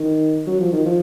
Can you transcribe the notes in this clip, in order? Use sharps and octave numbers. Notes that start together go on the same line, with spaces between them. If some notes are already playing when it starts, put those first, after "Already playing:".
Already playing: D#3
F#3
F3
D#3
F3